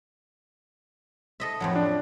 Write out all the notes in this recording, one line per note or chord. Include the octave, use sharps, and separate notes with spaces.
A4 D#5 E5
F2 A2 F#3
D4